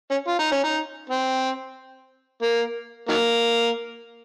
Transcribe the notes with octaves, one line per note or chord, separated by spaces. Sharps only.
C#4
F4
D#4
C#4
D#4
C4
A#3
D#3 F#3 A#3